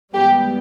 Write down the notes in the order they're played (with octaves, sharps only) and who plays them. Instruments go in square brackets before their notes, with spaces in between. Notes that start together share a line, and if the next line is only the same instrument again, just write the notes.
[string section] G#2 E3 G3 B3 G4